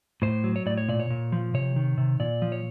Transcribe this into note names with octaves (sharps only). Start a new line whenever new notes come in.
A2 C5
F#3
C#5
A2 D5
C#5
A#2 D5
C#5
A#2
F3
C3 C#5
D#3
C3
A#2 D5
F3
C#5